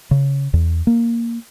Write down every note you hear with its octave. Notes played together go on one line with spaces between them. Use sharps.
C#3
E2
A#3